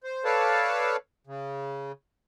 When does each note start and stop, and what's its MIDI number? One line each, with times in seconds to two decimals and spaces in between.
0.04 0.24 72
0.25 0.96 69
0.25 0.96 71
0.25 0.96 73
0.25 0.96 74
0.25 0.96 77
0.25 0.96 81
1.27 1.92 49